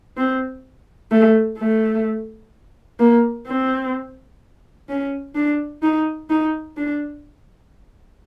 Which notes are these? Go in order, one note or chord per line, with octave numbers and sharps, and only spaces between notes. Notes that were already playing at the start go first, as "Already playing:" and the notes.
C4
A3
A3
A#3
C4
C#4
D4
D#4
D#4
D4